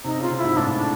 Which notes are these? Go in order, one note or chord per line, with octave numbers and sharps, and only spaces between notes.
C3 D#4
C#3 F4
C3
G#2 E4
A2 D4
D4